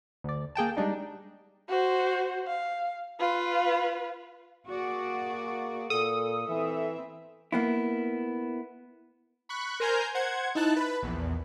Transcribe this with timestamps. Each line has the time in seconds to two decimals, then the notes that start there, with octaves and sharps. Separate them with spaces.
0.24 D2 D5
0.55 A#3 G#4 G5 A5
0.77 G3 G#3 D4 D#4
1.69 F#4 C5
2.47 F5
3.20 F4 B4
4.67 A#3 F#4 G#4 D5
5.90 A#2 A4 D#6
6.49 E3 C4 E5
7.52 A#3 B3 E4
9.49 B5 C#6 F#6
9.80 A#4 C5 G#5 A#5 F6 G6
10.14 C5 F#5 G#6
10.55 D#4 E4 A5 F#6
10.76 B4 B5
11.03 A#1 E2